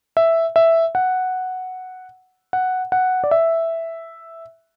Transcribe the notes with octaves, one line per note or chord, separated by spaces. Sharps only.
E5
E5
F#5
F#5
F#5
D5
E5